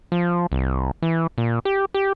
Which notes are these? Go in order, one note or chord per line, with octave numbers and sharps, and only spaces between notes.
F3
C2
E3
A#2
G4
G4